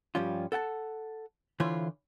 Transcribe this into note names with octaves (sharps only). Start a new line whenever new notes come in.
G2 F3 G3 C#4 F4
A4 F#5 G5 A5
D3 E3 E4 F4 C5 C#5